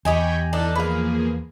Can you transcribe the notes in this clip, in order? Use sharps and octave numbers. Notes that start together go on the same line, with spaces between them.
E2 G4 D#5 G5 G#5 B5 C#6
E3 D4 D#4 A4 A5
F3 A#3 G#4 B4 F5